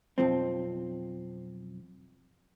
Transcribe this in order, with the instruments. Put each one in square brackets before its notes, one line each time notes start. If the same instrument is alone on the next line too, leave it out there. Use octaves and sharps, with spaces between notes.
[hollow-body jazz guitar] B1 F2 F3 C4